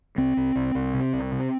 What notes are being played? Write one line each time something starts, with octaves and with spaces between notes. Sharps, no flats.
C2 C4
C2
C2
C2
C3
C2
C3